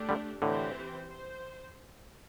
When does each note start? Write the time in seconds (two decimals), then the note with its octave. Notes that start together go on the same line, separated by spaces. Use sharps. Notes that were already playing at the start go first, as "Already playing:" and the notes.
Already playing: A3 D4 G4
0.09 D3 G3
0.42 A2 D3 E3 C4 G4 C5
1.07 C5